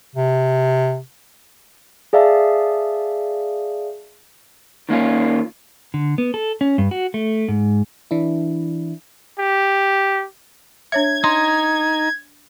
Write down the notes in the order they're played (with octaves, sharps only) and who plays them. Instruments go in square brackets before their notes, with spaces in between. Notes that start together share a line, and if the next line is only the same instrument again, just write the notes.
[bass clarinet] C3
[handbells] G#4 D5 E5 F5 A5
[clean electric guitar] D#3 A#3 C#4 F4
[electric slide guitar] D3
B3
A4
C#4
G2
F#4
A3
G#2
[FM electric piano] E3 D4 E4
[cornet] G4
[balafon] D4 C#5 E5 [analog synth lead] G#6
[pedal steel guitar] D#4 [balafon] C6